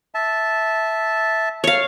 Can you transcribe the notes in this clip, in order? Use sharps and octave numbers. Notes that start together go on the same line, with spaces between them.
E5 A5
C#5 F5